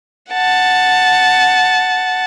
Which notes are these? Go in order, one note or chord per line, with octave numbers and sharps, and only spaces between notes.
F#5 A5